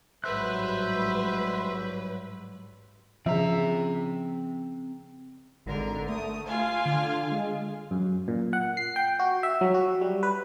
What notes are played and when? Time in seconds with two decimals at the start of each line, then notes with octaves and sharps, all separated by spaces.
0.24 A1 G#2 F#3 G3 B4 C5 E5 F#6
3.26 C#3 F3 C4 E5 A#5
5.66 G#1 D3 A#4
6.09 A3 D#6
6.47 F4 F5 G#5
6.86 D3
7.31 G#3
7.91 F#2
8.28 A#2
8.53 F#5
8.77 C7
8.96 G5
9.19 F#4
9.43 E5
9.61 F#3
9.74 F#4
10.01 G3
10.23 B4